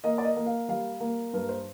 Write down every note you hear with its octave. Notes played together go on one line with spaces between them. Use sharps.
A#3 D#5
D5
D#5
A#3
F5
G3 F5
A#3
G2 A#4
C5